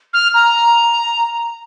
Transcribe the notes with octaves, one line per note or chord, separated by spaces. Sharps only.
F6
A#5